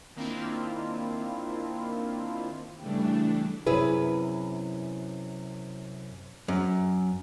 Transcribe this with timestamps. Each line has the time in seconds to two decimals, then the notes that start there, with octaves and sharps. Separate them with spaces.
0.16 D#3 A#3 C4 D4 E4 F4
2.81 C#3 E3 G3 A3 D4
3.67 F#2 C3 E4 G#4 B4
6.48 F#2